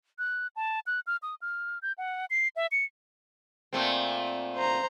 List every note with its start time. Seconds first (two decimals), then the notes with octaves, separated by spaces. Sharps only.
0.19 F#6
0.56 A5
0.87 F#6
1.07 F6
1.22 D#6
1.42 F6
1.82 G6
1.98 F#5
2.30 C7
2.56 E5
2.71 C#7
3.73 A#2 A3 C4
4.57 C5 A#5